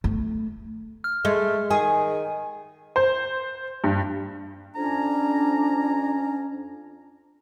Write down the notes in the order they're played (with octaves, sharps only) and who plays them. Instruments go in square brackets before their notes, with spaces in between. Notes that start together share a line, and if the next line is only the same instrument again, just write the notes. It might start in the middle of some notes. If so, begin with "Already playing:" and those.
[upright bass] A3
[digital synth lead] F6
[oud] G#3 [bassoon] A3
[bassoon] D#3 [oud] G#4 [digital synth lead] G#5
[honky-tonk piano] C5
G2
[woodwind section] F2 C#4 [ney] D4 [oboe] A#5